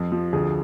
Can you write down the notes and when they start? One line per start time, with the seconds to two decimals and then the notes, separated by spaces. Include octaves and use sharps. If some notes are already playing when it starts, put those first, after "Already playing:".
Already playing: F2
0.12 F3
0.33 D2 G#4